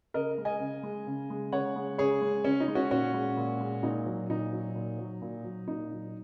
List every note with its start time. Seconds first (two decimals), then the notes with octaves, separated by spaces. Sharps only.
0.14 C#3 A#4 D#5
0.38 G#3
0.45 D#5 G#5
0.60 C#3
0.83 G#3
1.07 C#3
1.30 G#3
1.52 C#3 C#5 F#5
1.76 G#3
1.98 C#3 G#4 C#5
2.22 G#3
2.45 C#3 C#4
2.60 D#4
2.68 G#3
2.75 C#4 F#4
2.91 A#2 C#4 F#4
3.14 G#3
3.37 A#2
3.60 G#3
3.83 A#2 D#4
4.06 F#3
4.30 A#2 D#4
4.53 F#3
4.75 A#2
4.98 F#3
5.22 A#2
5.44 F#3
5.68 A#2 D#4
5.91 F#3